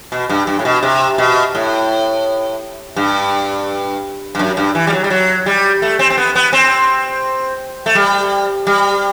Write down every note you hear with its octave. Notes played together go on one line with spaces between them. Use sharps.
B2
G2
G2
A2
B2
C3
B2
A2
G2
G2
F#2
G2
E3
G3
F#3
G3
F#3
G3
A3
C4
C4
B3
B3
C4
A3
G3
G3